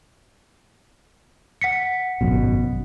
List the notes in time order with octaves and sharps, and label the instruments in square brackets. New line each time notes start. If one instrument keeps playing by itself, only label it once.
[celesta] F#5 B6 C#7
[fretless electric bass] G#1 F#2 B2